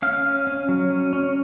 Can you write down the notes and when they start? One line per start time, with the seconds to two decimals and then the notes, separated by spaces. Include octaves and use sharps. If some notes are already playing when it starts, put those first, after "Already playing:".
0.02 C#4 F5
0.24 C#4
0.47 C#4
0.69 F#3
0.90 C#4
1.13 C#4